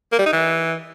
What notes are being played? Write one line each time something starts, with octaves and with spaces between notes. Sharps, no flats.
A#3
G3
D#4
E3